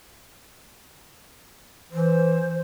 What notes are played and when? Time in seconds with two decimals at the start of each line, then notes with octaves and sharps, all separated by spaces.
1.91 E3 C5